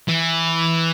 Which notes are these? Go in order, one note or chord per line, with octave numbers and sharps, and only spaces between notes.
E3